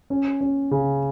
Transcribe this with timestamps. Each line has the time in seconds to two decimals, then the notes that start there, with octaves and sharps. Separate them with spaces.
0.10 C#4
0.41 C#4
0.71 C#3